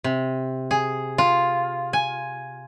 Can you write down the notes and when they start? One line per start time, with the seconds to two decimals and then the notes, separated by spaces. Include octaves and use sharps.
0.04 C3
0.71 G#4
1.18 F4
1.93 G#5